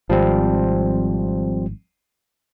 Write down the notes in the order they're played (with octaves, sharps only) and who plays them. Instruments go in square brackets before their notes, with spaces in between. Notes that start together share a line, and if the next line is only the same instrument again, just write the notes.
[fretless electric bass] G#1 [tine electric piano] F3 G3 C4